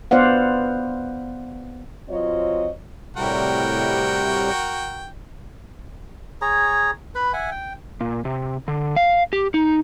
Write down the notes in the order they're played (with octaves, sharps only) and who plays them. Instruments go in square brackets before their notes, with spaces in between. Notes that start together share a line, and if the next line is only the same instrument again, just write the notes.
[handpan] B3 C5 D5 F5 F#5
[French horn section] F#3 C4 F4 C#5 D#5
[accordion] A2 C3 G3 [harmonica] F#4 A#4 G5
[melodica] G#4 C#5 A#5
B4 B5
E5 F#5 G#5
G5
[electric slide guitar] A#2
C3
D3
F5
G4
D#4